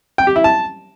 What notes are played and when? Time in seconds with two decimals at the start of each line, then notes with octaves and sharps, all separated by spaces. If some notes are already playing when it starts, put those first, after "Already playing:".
0.18 G5
0.27 G4
0.36 E4
0.44 A5